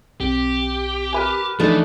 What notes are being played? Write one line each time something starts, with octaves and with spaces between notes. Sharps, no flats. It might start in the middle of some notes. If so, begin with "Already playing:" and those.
B1 C4 G4
A#4 B4 G#5
E3 F3 A3 D4 D#4